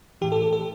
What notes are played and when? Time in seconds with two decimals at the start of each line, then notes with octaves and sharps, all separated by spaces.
0.21 A2 E3 G4
0.32 A4
0.42 A4
0.53 A4